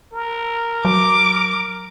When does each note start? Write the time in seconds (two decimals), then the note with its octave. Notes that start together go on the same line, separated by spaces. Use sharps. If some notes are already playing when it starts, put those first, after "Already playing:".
0.14 A#4
0.85 F#3 D6